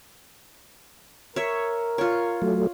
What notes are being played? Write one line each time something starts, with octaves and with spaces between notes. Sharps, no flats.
A#4 C#5 E5
F4 C#5
F#3 A3